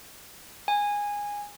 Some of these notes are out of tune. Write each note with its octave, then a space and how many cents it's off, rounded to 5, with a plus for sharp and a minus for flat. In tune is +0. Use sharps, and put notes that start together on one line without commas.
G#5 -15